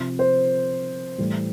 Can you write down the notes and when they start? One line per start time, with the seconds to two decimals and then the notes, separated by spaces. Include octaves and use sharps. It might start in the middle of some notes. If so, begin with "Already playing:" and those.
Already playing: C3 F3
0.19 C5
1.18 A2 E3 G3